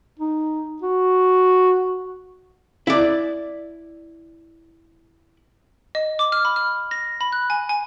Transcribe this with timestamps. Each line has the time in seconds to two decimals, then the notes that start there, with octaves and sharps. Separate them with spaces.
0.19 D#4
0.82 F#4
2.87 E4 D5
5.95 D#5
6.19 D6
6.32 F6
6.45 B5
6.56 F6
6.91 A#6
7.21 B5
7.32 F#6
7.50 G#5
7.69 G#5